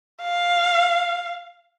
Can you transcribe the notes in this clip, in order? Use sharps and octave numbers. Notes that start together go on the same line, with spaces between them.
F5